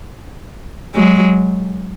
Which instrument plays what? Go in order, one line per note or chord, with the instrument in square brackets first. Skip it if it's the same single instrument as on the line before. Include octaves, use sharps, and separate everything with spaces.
[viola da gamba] F#3 G#3